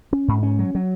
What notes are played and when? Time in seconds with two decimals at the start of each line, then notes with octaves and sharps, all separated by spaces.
0.13 C#4
0.28 G#2
0.43 C#4
0.59 F#3
0.75 F#3